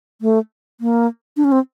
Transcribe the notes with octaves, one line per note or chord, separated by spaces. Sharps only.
A3
A#3
D4
C#4
C4